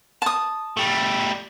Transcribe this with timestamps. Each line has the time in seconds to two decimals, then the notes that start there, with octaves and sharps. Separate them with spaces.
0.22 A5 D#6
0.77 G3 A3